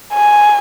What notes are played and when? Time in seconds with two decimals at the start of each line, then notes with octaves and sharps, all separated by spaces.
0.14 G#5